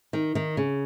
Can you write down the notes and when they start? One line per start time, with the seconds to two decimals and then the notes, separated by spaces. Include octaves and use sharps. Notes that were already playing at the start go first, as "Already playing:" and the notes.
0.13 D#3
0.35 D#3
0.57 C#3